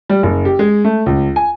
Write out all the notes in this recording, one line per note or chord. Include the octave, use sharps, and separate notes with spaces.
G3
F#1
G4
G#3
A3
C#2
G#5